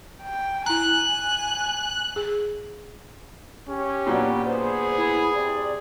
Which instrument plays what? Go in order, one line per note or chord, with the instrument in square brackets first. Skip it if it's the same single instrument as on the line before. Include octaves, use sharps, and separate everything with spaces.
[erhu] G5
[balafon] E4 A#5 [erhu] G#5 [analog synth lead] F#6
[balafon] G#4
[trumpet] C#4 [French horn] G4
[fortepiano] A#2 F#3 D4 [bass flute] B3
[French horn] B3 [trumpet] G#4 [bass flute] C5
[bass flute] E4
[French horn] C3 [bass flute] D5